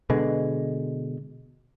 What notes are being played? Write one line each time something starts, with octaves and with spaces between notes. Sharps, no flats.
B2 D3 G#3